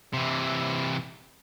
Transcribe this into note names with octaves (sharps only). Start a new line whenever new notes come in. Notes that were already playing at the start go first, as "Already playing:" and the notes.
C3 E3